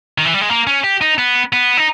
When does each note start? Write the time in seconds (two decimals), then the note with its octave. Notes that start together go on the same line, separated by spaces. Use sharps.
0.18 D#3
0.25 E3
0.34 G3
0.41 G#3
0.49 A#3
0.67 C#4
0.84 G4
1.01 D#4
1.18 B3
1.53 B3
1.77 D#4